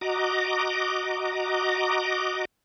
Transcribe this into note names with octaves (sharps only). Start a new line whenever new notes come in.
F#4 D#5 A#5 D6